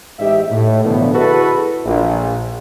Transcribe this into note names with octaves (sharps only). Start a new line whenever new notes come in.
A1 G#2 G4 D#5 E5
A2
A#1 B2 D3 E3
E4 F#4 G#4 A4 B4
A#1